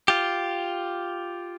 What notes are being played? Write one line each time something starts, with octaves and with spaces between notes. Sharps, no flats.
F4 G4